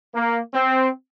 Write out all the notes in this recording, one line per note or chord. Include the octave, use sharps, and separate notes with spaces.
A#3
C4